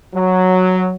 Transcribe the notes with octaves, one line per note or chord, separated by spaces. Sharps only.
F#3